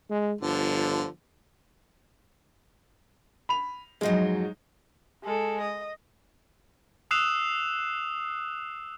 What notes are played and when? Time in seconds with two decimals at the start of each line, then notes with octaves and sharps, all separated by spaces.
0.10 G#3
0.41 G1 D3 F3
3.49 B5 F7
4.01 F2 G#2 F#3 G#3 D#4
5.24 G#3 A4
5.61 D#5
7.11 D#6 E6 F#6 C7 E7 F7